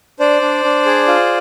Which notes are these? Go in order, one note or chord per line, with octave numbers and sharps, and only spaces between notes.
D4 C5 D5
D4
D4
G#4
F4